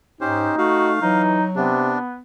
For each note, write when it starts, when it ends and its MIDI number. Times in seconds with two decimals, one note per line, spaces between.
0.21 0.49 44
0.21 0.55 61
0.21 0.99 63
0.21 0.55 67
0.21 0.55 72
0.58 0.99 57
0.58 0.93 66
0.58 1.22 77
1.02 1.41 52
1.02 1.75 54
1.02 1.45 63
1.56 1.98 48
1.56 2.21 59
1.56 1.98 62